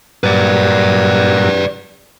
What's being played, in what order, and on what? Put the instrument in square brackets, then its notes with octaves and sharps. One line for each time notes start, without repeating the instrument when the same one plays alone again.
[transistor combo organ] G2 A#2 F#3 [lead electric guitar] B4 D5